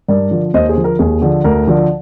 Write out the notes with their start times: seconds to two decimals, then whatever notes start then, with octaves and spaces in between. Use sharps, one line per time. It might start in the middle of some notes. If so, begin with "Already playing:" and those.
0.08 G2 A#4 D5
0.31 D3 F3
0.54 D#2 C5 D#5
0.69 G#4 C5
0.77 D3 F3
0.84 A#4
0.99 D#2 G#4
1.22 D3 F3
1.44 D2 A#4
1.67 D3 F3